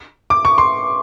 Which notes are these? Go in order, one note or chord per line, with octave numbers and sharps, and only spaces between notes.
D6
C#6
C6